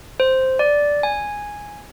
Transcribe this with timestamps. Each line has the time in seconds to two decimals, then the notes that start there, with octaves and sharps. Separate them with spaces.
0.20 C5
0.59 D5
1.03 G#5